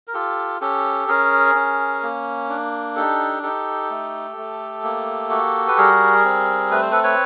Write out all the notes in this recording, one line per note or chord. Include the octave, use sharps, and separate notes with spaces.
A#4
F4 G4 A4
C#4 G4 A4
C#4 G#4 A#4
C#4
A#3
D4
D#4 G4 A4
D#4 G4 A4
A3
A3
A#3
F#4
B4
G3 G#4 A#4
C4
A3 B4
C5
A4 B4
B4 C#5